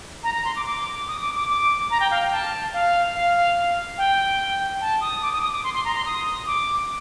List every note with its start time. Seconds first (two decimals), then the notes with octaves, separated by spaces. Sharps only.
0.24 A#5
0.35 A#5
0.45 C6
0.56 D6
0.66 D6
1.08 D#6
1.21 D6
1.35 D6
1.49 D6
1.91 A#5
2.00 G5
2.11 F5
2.21 G5
2.32 A5
2.73 F5
3.15 F5
3.98 G5
4.81 A5
5.01 D#6
5.22 D6
5.33 D#6
5.43 D#6
5.53 D6
5.64 C6
5.74 C6
5.85 A#5
5.95 C6
6.06 D#6
6.47 D6